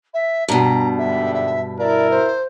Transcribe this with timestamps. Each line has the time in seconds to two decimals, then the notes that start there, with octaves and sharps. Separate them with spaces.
0.14 E5
0.48 G2 B2 A#5
0.97 G#2 D3 G3 E5
1.33 E5
1.78 E4 A#4 D5 E5
2.10 C5